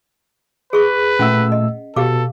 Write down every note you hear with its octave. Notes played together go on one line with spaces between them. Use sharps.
G#4 B4 C#6
A#2 A3 C#4 F#5 E6
D#5
B2 G4 A4 F5 D6